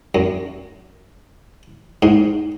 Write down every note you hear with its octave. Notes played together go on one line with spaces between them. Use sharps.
F#2
G#2